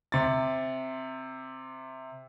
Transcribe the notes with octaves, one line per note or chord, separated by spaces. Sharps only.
C3 A6